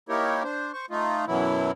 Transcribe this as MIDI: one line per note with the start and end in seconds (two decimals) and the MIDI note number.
0.09 0.43 58
0.09 0.43 63
0.09 0.43 64
0.09 0.43 67
0.09 0.43 70
0.09 0.43 73
0.43 0.72 62
0.43 0.72 72
0.73 0.86 72
0.73 0.86 85
0.90 1.25 57
0.90 1.25 63
0.90 1.25 65
1.27 1.71 42
1.27 1.71 47
1.27 1.71 52
1.27 1.71 54
1.27 1.71 64